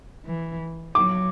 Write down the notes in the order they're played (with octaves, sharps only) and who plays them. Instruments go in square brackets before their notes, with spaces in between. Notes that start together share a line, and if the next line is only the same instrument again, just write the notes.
[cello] E3
[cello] F#3 [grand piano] D6